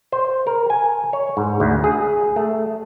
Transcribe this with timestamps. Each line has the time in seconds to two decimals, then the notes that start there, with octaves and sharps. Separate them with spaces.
0.12 C5
0.47 A#4
0.70 G#5
1.13 C#5
1.37 G#2
1.60 D2
1.84 G#4
2.36 A3